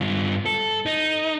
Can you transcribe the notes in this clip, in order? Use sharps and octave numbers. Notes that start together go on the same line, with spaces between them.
G2 F4
A4
D#4